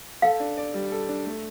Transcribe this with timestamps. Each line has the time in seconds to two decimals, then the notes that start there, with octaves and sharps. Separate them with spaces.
0.22 A4 F5
0.40 D4
0.57 D5
0.74 G3
0.92 A4
1.09 D4
1.26 A3